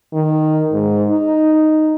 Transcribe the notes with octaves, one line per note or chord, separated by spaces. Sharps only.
D#3
G#2
D#4